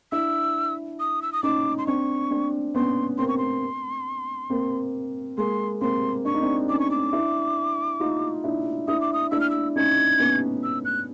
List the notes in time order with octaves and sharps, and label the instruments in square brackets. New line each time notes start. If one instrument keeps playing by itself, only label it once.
[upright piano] D4 E4 [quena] E6
[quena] D#6
E6
D#6
[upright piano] C#4 D#4 [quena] D6
[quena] C6
[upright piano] C4 D4 [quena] C#6
[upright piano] C4 D4
[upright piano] B3 C#4 [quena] C6
[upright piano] A#3 C4 [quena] C6
[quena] C#6
C6
[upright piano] A#3 C4
[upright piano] G#3 A#3 [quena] C6
[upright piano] A#3 C4 [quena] C6
[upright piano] D4 [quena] C#6
[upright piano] D#4
C4 D4
[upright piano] C#4 D#4 [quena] D6
[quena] C#6
D6
[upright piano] D4 E4
D#4 F4
D4 E4
[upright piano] D4 E4 [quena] D#6
[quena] D6
D#6
[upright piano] D4 E4 [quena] E6
[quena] F6
E6
[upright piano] C#4 D#4 [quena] G#6
[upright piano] B3 C#4
[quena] E6
F#6